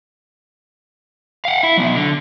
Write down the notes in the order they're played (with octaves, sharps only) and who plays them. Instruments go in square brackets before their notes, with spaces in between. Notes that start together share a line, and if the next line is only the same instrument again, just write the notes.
[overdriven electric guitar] F5 F#5
E4
F#3 B3
D3